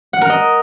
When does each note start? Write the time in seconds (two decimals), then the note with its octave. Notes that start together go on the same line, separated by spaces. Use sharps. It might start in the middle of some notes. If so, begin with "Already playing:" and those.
0.13 F#5
0.21 A#4
0.30 D#5